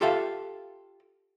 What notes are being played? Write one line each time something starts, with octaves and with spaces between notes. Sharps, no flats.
F4 G4 A4 E5 F5